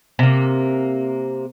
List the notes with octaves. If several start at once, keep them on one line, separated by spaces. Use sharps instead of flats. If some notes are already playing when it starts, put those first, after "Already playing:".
C3 A#3